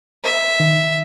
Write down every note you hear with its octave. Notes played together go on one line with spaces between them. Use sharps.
E5
D#3